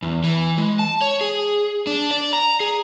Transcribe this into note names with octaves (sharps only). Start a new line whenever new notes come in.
E2
E3
G#3
A5
C#5
G#4
D4
D5
A#5
G#4